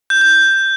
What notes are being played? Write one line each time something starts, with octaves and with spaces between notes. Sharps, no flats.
G6
G6